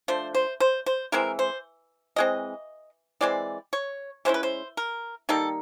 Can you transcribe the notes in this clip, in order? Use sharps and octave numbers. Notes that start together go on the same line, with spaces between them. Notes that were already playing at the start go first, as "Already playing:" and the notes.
F3 A3 D4 C5
C5
C5
C5
E3 G#3 C4 E4 A#4
C5
E3 G#3 C4 D#5
E3 G#3 C4 D5
C#5
E3 G#3 C#4 E4 C5
B4
C5
A#4
D#3 G3 A#3 D#4 A4